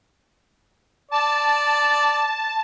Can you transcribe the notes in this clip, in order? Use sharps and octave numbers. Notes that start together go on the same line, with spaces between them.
D5 A5